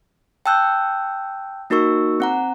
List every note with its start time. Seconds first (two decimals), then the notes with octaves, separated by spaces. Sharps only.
0.46 G5 A5 E6 F#6 G6
1.70 A#3 D#4 F#4 A#4 C#6 E6
2.20 C4 F#5 A#5